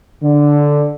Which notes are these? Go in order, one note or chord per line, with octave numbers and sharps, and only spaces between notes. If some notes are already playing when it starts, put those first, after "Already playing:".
D3